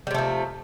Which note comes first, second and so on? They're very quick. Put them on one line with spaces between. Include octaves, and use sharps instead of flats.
G3 C3 A3 F3